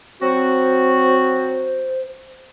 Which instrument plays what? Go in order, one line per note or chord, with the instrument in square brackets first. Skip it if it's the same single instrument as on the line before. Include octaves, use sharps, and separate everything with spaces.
[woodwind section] F#3 C4 F#4 [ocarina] C5